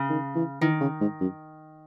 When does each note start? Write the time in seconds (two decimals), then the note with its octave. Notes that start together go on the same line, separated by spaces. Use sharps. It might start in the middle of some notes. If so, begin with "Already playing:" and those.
Already playing: C#3
0.10 D#3
0.35 E3
0.61 D#3 E3
0.81 C#3
1.01 G#2
1.21 F#2